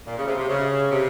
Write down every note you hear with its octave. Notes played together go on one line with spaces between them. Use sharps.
A#2
C#3
C3
C3
C#3
C3